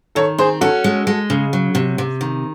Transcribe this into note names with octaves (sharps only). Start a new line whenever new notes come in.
D#3 A4 C#5
C4 G#4 C5
C#4 F#4 A4
G#3
G#3
C#3
F#3
C3
C3
D#3